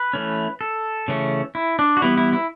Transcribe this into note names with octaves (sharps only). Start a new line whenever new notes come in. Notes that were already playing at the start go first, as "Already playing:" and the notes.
Already playing: B4
E3 A3 C#4
A4
C#3 E3 A3 C#4
E4
D4
F#4
E3 G3 B3 E4
E4
E4